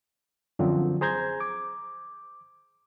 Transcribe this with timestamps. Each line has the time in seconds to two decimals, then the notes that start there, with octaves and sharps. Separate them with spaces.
0.59 F#2 D3 F3 F#3 C4
1.01 G#4 C5 A#5 G6 G#6
1.40 D6